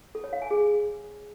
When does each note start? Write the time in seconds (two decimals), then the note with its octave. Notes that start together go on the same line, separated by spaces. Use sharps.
0.15 A4
0.24 C#5
0.33 F5
0.42 G#5
0.51 G#4